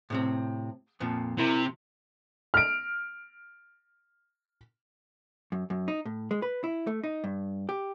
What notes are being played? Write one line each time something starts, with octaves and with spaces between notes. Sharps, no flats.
A2 C3 C4
F2 A#2 F3
C3 E4 A#4
F6 D7
F#2
F#2
D#4
A2
G#3
B4
E4
A3
D#4
G2
G4